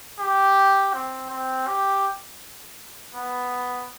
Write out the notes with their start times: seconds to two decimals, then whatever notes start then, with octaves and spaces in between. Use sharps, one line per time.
0.20 G4
0.94 C4
1.30 C4
1.68 G4
3.15 B3